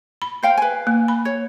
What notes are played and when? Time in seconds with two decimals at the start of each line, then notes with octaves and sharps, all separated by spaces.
0.22 B5
0.43 C5 F5 G5
0.57 B4 G#5
0.87 A#3
1.08 B5
1.25 C#5